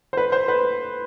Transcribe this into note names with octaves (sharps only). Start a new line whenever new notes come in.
C5
B4
C5
B4